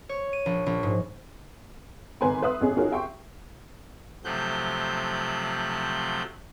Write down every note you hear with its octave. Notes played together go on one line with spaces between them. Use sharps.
C#5
D#7
A#1
A#1
G#2
G#1 B4 G#5 A#5 C6
B4 E5 C6 D#6 F#6
A1 C3 C#4 G#4
D#4 F4 F#4 G#4 A#4 C#5
E5 G5 C6 C#6
C3 F3 F#3 A3 F#6 G6